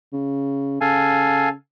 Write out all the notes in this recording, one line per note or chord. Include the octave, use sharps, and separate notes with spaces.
C#3
C#3 A4 F5 G#5